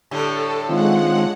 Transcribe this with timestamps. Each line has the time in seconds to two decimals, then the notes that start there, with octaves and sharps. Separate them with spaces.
0.11 A2 D3 G3 A4
0.69 D#3 G#3 C4 F4 F#5